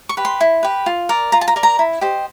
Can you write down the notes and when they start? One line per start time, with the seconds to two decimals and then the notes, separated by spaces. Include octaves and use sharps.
0.09 C#6
0.17 G4 B4
0.25 C6
0.41 E4
0.63 G4 B4
0.86 F4
1.09 A#4 D5
1.32 F4 A#5
1.41 A5
1.48 A#5
1.56 A#4 D5
1.63 A#5
1.79 E4
2.01 G4 C5 D#5